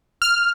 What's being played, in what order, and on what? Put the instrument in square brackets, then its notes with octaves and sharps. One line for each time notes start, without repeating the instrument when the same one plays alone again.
[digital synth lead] F6